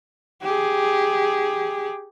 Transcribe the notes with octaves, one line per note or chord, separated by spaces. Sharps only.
G4 G#4